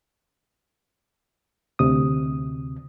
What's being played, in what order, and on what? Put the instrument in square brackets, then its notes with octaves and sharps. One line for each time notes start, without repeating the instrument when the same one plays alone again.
[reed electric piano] D2 C3 D#6